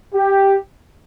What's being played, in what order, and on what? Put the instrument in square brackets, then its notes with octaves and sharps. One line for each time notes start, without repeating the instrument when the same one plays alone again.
[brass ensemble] G4